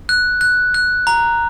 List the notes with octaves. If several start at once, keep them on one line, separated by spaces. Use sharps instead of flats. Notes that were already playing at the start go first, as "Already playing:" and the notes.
F#6
F#6
F#6
A#5